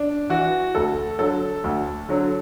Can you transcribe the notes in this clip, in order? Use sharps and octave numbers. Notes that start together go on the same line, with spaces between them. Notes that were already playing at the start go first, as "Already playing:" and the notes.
Already playing: D4
E3 F#4
D2 A4
D3 F#3 A4
D2
D3 F#3